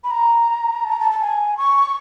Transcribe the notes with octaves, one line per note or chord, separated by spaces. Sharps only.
B5
A#5
A5
A#5
A5
A5
G#5
C#6